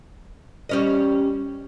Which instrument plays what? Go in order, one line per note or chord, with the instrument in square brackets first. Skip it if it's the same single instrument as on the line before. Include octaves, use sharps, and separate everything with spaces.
[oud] G3 C#4 D#5